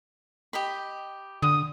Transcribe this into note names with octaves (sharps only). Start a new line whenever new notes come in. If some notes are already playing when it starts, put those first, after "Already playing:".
G4 D#5 B5
D3 D#6